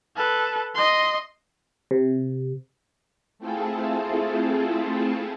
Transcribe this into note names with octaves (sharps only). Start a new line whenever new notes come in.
A4 B4
D#5 C6
C3
A3 C4 E4 F4 G#4 A4